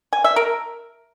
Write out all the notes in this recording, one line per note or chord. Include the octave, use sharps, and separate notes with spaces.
G#5
E5
A#4